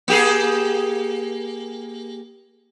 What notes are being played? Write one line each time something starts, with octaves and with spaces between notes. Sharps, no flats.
A#3 G4 G#4